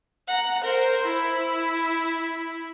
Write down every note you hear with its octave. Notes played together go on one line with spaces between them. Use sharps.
F#5 A#5
A#4 C5
E4